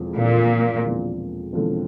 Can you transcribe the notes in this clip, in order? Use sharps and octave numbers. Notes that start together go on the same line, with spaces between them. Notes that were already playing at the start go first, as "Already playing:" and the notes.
Already playing: E1 E2 D3 F3 C4
E1 E2 A#2 D3 F3 C4
E1 E2 D3 F3 C4
E1 E2 D3 F3 C4